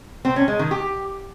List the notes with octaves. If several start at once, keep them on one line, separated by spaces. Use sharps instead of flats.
C4
C#4
G#3
D#3
G4